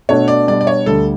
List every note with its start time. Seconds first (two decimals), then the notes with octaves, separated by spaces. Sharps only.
0.09 B2 A3 D4 F#4 C#5
0.28 D5
0.48 B2 G3 D4 D5
0.61 D5
0.67 C#5
0.86 D2 D3 G3 A4